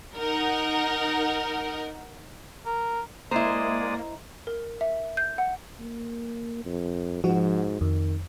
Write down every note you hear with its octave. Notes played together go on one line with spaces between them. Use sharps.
D#4 A#4 F#5
A#4
G#3 A#3 E4 C5 D5 D#5 A#5 D#6
A#4
E5
G6
F#5
A#3
F2
G#2 F3 F#4
F2 D#3